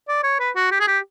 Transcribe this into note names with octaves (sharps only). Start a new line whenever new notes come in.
D5
C#5
B4
F#4
G4
G#4
G4